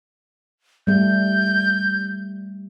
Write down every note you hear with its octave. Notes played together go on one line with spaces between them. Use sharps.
G3 A3 G6